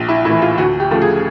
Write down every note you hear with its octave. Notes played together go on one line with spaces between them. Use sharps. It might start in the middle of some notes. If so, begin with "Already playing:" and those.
Already playing: A#1
E4
A2 E3 E4
F4
D2 F#4
G4
C#3 F3 A3
G#4